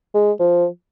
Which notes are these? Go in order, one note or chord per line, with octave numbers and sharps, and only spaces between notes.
G#3
F3